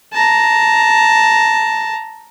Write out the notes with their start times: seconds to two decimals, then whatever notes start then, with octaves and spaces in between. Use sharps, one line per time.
0.13 A5 A#5